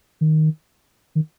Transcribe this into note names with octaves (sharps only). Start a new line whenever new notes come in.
D#3
D#3